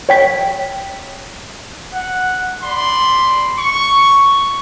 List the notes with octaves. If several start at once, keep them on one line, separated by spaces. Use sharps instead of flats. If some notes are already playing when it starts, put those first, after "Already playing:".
C#5 G5 B6
F#5
D5 B5 C6
C#6